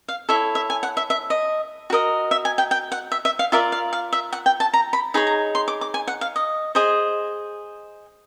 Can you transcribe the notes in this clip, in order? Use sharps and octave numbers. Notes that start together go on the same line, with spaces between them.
F5
E4 A4 C#5 E5
E5
G#5
F#5
E5
E5
D#5
F#4 A#4 D#5
E5
G#5
G5
G5
F#5
E5
E5
F5
F4 A#4 D5 E5
F5
F5
E5
F#5
G5
A5
A#5
B5
D#4 G#4 C#5 B5
A#5
C6
D6
D6
G#5
F#5
F5
D#5
G#4 C5 D#5